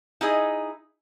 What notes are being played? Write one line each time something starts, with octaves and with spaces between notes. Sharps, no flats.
D#4 E4 G#4 D#5